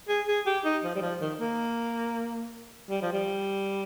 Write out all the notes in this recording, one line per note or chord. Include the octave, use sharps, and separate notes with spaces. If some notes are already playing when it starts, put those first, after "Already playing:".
G#4
G#4
G4
D#4
F3
G3
F3
D#3
A#3
G3
F3
G3